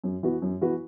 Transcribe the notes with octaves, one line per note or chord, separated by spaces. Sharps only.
F#2
E3 B3 F#4 B4
F#2
E3 B3 F#4 B4